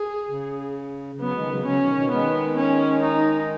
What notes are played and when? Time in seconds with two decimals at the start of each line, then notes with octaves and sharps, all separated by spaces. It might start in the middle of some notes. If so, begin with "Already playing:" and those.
Already playing: G#4
0.29 C#3
1.20 C#3 F#3 B3
1.35 D#3 G#3
1.51 C#3 F#3
1.66 C#3 F#3 C#4
1.81 B2 D#3
1.96 B2 D#3
2.12 D#3 G#3 B3
2.57 C#4
3.03 D#4